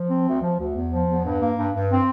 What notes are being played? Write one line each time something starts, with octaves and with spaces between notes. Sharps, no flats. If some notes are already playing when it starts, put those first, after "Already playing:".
Already playing: F3
C4
D2
F3
D2
E2
F3
E2
G2
A#3
G2
G2
C4